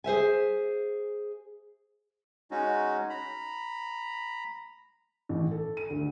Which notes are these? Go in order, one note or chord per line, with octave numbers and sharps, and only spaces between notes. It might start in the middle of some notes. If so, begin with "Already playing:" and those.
G#4 C5 E5 G#5
G#3 C#4 D#4 F#4
A#5 B5
A1
A4
D#7
D2